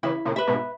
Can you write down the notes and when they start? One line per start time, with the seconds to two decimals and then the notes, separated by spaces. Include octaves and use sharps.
0.03 C#3 E3 E4
0.25 A#2 C#3
0.36 B4 E5
0.47 G#2 B2